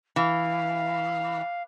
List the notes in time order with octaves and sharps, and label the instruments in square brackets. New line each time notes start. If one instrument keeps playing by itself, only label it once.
[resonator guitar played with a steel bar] E3 [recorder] F5